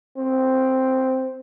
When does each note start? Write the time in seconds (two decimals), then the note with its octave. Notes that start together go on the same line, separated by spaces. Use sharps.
0.17 C4